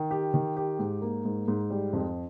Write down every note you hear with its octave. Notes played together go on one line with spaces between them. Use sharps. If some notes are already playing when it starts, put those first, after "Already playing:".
Already playing: D#3
G4
D#3
G4
G#2
A#3
G#2
G#2
G3
F2